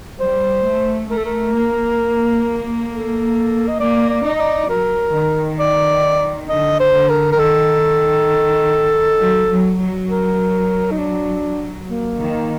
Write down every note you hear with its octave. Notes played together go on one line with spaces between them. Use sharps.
G3 C5
A3
A3 A#4
A4
A#4
A#3
A4
D#5
A#3 D5
D5
D#4
D#5
D5
F#3 A#4
D#3
D5
D3 D#5
C5
D3
A#4
A#4
D#3 A4
F#3
F#3
F#3
A#4
D#4
D4
A#3
D#3